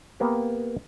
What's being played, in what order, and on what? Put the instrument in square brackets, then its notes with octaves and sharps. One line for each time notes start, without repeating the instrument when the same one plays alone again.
[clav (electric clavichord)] A#3 B3 G4